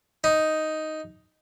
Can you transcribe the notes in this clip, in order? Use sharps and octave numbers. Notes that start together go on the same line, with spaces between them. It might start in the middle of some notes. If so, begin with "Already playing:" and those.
D#4